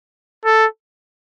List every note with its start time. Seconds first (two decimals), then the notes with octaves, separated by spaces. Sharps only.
0.45 A4